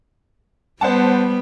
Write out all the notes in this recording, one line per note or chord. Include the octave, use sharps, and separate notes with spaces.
G3 B3 C5 F#5 A5